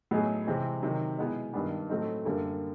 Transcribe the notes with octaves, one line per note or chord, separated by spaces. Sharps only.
A2 F#3 B3 D#4 G#4
C3 E3 G#3 C4
C3 D#3 F#3
B2 G#3 B3 E4
G2 D#3 G3 B3 D4
A2 F#3 A3 C4 D#4
F#2 D3 G3 A#3